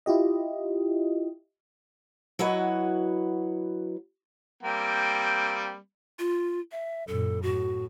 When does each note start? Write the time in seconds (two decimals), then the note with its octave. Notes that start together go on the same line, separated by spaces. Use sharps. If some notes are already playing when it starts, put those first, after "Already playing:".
0.06 E4 F4 G4 D#5
2.39 F#3 E4 F#4 B4 D#5
4.63 G3 A#3 C4
6.19 F4
6.72 E5
7.08 F#2 A#2 A4
7.43 A2 F#4